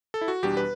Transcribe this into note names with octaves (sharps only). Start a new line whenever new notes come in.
A4
E4
F#4
E2 B2 G3 D4 G4
B4